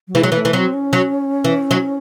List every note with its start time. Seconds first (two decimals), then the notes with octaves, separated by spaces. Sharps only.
0.08 F#3
0.15 E3 G#3
0.23 F#3
0.32 E3 A3
0.45 E3
0.53 F#3 C4
0.74 C#4
0.93 F#3
1.44 E3
1.71 F#3